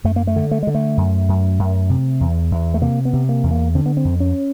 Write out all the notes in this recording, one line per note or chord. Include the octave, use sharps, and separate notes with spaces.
F#2 A3
A#3
A3
D3
A3
D3 G#3
A3
F#2
F#2
F#2
C3
E2
E2
A3
C3 A#3
B3
C3
A#3
E2
A#3
D3 C4
B3
C4
F2
C#4